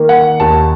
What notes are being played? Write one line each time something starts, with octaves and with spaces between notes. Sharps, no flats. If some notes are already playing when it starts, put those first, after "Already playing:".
Already playing: D#3 A#3
F#5
D#2 A5